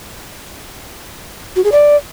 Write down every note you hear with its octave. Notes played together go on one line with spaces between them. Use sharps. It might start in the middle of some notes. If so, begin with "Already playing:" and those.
F#4
G#4
D5